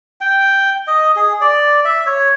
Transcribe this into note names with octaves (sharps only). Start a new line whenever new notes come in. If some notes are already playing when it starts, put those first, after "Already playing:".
G5
D#5
G#4
D5
E5
C#5